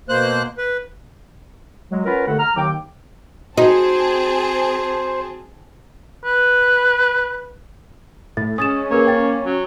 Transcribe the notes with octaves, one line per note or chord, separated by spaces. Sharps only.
B2 A#3 C5 F#6
B4
F#3 G#3
C#4 F4 A#4 B4 F#5 B5
D#2 D3 A3 A4 F#5
A#5 F6
D#2 D#3 F#3 G5 D6
C4 D#4 F#4 G#4 C5 A5
B4
A2 A6
G#3 C#4 D#6 A6 E7
A#3 G#4 A#4 B4 C#5
G5 A6
F#3